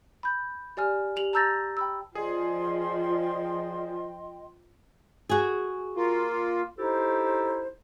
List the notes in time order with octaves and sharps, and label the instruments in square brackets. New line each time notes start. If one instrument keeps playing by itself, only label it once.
[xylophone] B5 G6
G4 D5 G#5 F6
G4 F7 F#7
A5 A#5 E6 G6 A6 A#6
G5 B5 E6
[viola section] F3 [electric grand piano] G#4 [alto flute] D5 [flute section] D#5 G5 C6
[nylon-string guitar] F#4 G#4
[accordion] A#3 F4
[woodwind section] D#4 E4 G4 A4 C5